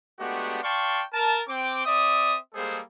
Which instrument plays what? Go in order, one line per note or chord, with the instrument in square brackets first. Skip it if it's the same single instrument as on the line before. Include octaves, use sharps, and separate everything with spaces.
[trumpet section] G#3 A3 B3 D4 F#4 G4
D5 F5 G5 A5 C6 C#6
A#4 A5
C4 G5 D6
C4 D5 E5 D#6
G3 G#3 A#3 G#4 A4 C5